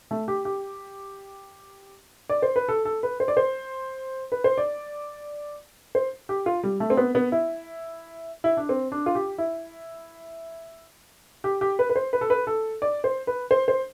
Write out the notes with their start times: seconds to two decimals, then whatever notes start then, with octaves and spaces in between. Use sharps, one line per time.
0.11 A3
0.28 G4
0.45 G4
2.30 D5
2.42 C5
2.56 B4
2.68 A4
2.85 A4
3.03 B4
3.20 C5
3.28 D5
3.37 C5
4.32 B4
4.44 C5
4.58 D5
5.95 C5
6.29 G4
6.46 F4
6.63 G3
6.80 A3
6.90 C4
6.97 B3
7.15 B3
7.32 E4
8.44 E4
8.57 D4
8.69 C4
8.92 D4
9.06 F4
9.15 G4
9.38 E4
11.44 G4
11.61 G4
11.79 B4
11.90 B4
11.96 C5
12.13 B4
12.21 A4
12.30 B4
12.47 A4
12.82 D5
13.04 C5
13.27 B4
13.51 C5
13.68 C5